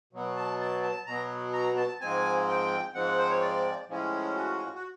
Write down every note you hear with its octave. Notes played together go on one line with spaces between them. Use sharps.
B2 F#3 B3
A5
A5
A5
B2 F#3 B3 A#5
A#5
A5
G#2 F3 G#3 C4 G#5
G5
G#2 F3 G#3 C4 F#5
C5
C#5
D5
A2 F3 G#3 C#4
F#4
F#4